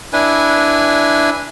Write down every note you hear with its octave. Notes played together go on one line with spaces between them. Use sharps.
D4 E4 B4 G#5